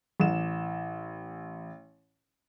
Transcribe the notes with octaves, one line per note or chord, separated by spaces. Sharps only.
A1 E7